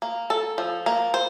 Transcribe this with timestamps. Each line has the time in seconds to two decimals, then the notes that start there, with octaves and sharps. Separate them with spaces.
0.02 A#3
0.30 A4
0.58 F3
0.86 A#3
1.14 C5